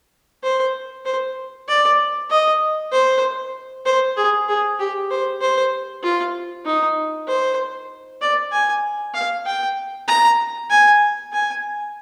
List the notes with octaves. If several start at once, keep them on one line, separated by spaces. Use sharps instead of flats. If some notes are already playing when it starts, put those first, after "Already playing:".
C5
C5
D5
D#5
C5
C5
G#4
G#4
G4
C5
C5
F4
D#4
C5
D5
G#5
F5
G5
A#5
G#5
G#5